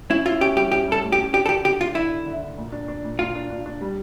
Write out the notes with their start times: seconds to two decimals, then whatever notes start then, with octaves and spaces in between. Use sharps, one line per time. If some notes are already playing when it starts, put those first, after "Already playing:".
0.10 C#4 E4
0.26 E4 F4
0.41 C#4 G4
0.56 G3 G4
0.72 C#4 G4
0.87 G3 A4
1.03 A2
1.12 G4
1.18 C#4
1.33 D4 G4
1.46 A4
1.49 D3 G4
1.64 D3 G4
1.79 D3 F4
1.95 D4 E4
2.11 D3
2.26 D3
2.42 D3
2.58 A#2
2.72 D4
2.88 D4
3.04 A#2
3.19 A#2 F4
3.35 D4
3.50 D4
3.66 D4
3.81 G3